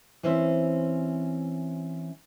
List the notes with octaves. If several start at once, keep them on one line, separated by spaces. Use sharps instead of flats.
E3 C4 C#4 C5 E5